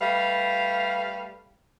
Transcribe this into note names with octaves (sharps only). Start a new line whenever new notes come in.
G3 A3 B4 F5